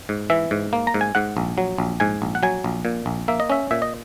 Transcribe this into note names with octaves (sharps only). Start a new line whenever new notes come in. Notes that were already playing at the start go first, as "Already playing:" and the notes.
G#2
E3 E5
G#2
A#3
A#5
G#2
G#5
G#2 F#5
A#1
F#3
A#1
G#2 G#5
A#1
F#5
F#3 G#5
A#1
A#2
A#1
A#3 E5
D#5
C#4 E5
A#2 E5
D#5